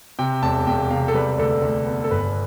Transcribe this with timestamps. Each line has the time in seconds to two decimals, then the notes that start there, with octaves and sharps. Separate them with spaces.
0.19 C3 G5
0.42 E1 A5
0.67 E1 G5
0.91 C3 F5
1.08 A4
1.14 G3 B4
1.38 D2 A4
1.62 D2
1.86 B3
2.04 A4
2.11 G1 B4